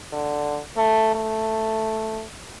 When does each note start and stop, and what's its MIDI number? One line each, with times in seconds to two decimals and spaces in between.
0.13 0.59 50
0.77 1.10 57
1.15 2.23 57